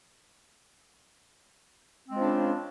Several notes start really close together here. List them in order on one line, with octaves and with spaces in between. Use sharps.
C4 G#3 F3 D4 C#3